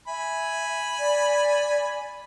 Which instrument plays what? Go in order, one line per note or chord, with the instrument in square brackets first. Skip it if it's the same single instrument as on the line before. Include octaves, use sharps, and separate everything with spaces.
[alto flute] E5 [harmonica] G#5 B5
[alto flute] D5